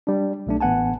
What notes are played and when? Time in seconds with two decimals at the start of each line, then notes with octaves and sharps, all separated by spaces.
0.07 G3 D4
0.47 B1 A3 D4
0.61 A1 B3 F#5 G#5 A5